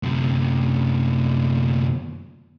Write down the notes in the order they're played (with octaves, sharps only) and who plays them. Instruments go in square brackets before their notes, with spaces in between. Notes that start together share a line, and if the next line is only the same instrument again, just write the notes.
[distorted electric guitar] F#2 C3